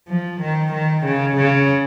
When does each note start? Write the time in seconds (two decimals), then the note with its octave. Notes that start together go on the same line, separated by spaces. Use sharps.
0.09 F3
0.40 D#3
0.73 D#3
1.05 C#3
1.37 C#3